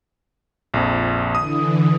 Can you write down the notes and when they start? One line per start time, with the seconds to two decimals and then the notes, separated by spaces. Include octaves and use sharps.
0.74 A#1 F2
1.35 D3 E3 D#6